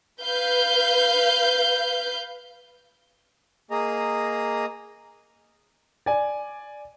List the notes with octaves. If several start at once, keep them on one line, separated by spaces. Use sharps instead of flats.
B4 F5 G6
A#3 G#4 D#5 A#5
D5 G#5